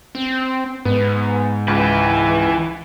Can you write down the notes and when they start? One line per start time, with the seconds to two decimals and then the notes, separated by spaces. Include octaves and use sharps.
0.15 C4
0.85 G#2 B3
1.68 C#2 E3 B4